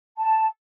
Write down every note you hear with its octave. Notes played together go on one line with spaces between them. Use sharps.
A5